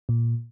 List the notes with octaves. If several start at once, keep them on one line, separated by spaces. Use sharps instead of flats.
A#2